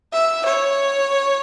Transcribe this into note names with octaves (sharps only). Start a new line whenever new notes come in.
E5
C#5